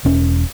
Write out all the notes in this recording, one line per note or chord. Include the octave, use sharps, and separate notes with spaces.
E1 C#4